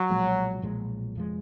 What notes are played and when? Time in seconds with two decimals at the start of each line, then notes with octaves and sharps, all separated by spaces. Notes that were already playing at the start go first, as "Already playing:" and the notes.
Already playing: F#3
0.10 B1 A#2 F3 G#3
0.62 B1 A#2 F3 G#3
1.15 F1 F2 F3 G#3